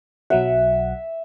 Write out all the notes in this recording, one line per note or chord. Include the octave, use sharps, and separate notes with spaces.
B1 F#3 E5 F#5